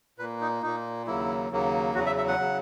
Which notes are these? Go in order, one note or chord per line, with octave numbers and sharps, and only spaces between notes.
A#2 A#3 B4
D#4
A#2 A#3 D#4
D#2 C#3 F#3 A#3 E4
D#2 C#3 F#3 A#3
E2 C#3 F#3 F#4
E5
E5
F#5
C#3 F#3